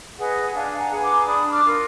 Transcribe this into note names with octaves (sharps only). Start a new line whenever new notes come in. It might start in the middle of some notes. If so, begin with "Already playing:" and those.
G#4 B4 D#5 F#5
D4 F5 G#5
F#5 A#5
G#4 B4
A#5 D6
D4 B5 D#6
D6 F6
F4 A#4